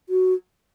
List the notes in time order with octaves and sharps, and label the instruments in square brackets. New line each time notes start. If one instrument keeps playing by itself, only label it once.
[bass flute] F#4